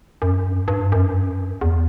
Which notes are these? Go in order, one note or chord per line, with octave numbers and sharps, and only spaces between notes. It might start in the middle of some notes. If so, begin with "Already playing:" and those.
F#2
G2
G2
F#2
E2